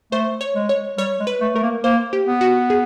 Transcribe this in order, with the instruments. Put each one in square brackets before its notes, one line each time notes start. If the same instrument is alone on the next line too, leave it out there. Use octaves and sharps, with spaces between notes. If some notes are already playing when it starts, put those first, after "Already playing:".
[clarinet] A3 [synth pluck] C5
[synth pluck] C#5
[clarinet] G#3
[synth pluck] C#5
[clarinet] G3 [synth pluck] C#5
[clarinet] G#3
[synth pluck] B4
[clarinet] A3
[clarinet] A3 [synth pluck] A#4
[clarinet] A#3
[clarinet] A#3 [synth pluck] C5
[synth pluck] G4
[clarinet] B3
[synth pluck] F#4
G#4